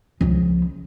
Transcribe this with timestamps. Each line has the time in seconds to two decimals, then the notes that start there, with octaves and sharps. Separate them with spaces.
0.21 C#2 F3